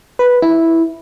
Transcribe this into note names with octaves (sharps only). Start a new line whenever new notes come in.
B4
E4